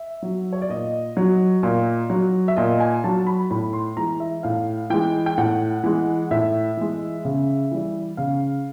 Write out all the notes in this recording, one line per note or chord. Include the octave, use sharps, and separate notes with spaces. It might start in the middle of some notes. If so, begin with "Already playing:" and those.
Already playing: E5
F#3
C#5
D5
A#2 D#5
F#3
A#2
F#3
E5
A#2 D#5
G#5
F#3 A5
B5
A2 B5
C6
E3 G#3 A#5
E5
A2 F5
E3 G#3 G5
G5
A2 F#5
E3 G#3
A2 E5
E3 G#3
C#3
E3 G3
C#3 F5